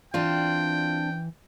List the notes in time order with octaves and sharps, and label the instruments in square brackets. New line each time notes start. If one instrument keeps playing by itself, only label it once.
[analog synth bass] E3 [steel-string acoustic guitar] C4 D4 [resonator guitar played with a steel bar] F4 [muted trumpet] G5